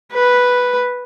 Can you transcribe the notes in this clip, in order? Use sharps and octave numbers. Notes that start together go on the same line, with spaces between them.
B4